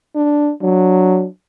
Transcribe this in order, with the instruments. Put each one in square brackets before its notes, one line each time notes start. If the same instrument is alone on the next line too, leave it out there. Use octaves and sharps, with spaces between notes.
[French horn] D4
[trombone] F#3 [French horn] D4